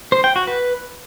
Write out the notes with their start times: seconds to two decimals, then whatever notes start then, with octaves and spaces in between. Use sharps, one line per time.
0.12 C5
0.24 G5
0.36 F#4
0.47 B4